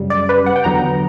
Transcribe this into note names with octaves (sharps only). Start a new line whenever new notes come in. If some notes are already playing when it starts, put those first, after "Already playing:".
Already playing: F#2 C#3 G3
D5
B4
F#5
G5
E2 D3 F#3 B3 A#5